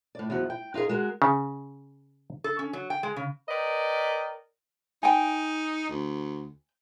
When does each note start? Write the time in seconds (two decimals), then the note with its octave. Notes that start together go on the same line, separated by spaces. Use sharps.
0.15 A2 D5
0.30 E2 G2 F3 F#4
0.50 G5
0.74 D#4 F4 F#4 G#4 A#4
0.89 G#3 F#4 A#4
1.22 C#3
2.44 A4
2.59 C#4
2.73 F#3
2.90 G5
3.03 G#3
3.16 C#3
3.49 A#4 B4 D5 D#5 G5
5.03 D#4 G5 G#5
5.89 D2